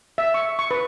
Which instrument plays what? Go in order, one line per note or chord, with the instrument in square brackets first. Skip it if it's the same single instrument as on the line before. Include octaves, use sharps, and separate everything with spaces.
[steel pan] E5
C#6
C#6
B4